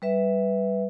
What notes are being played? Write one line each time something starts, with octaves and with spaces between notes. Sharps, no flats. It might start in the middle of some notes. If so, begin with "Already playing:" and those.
G3 B4 E5